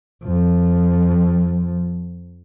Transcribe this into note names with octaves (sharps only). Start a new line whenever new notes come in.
F2 F3